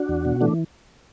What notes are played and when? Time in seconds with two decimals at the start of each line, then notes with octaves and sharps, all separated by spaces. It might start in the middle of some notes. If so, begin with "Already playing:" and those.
Already playing: D4 F#4
0.09 E2
0.25 B2
0.41 E3 A3 D4